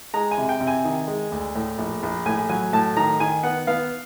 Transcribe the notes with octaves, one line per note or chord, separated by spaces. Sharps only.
G#3 A#5
G#5
C3
G5
C3
G#5
D#3
G#3
D2
A2
A#1
A#1
A2 G#5
F#3 G#5
A2 A5
D#3 A#5
D#3 G#5
B3 F#5
B3 F5